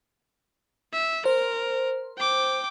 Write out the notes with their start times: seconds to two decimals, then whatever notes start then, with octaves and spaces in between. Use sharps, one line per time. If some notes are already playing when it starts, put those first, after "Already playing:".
0.93 E5
1.25 A#4 C5
2.17 G5 D6